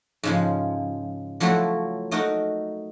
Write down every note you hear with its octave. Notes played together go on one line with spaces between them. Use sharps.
G#2 C#3 F3
F3 F#3 A3 E4 F#4
A3 D#4 F#4 A#4